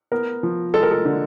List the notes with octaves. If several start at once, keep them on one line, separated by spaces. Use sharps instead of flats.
B3 A#4
F3
G#3 A4
A#4
A4
D3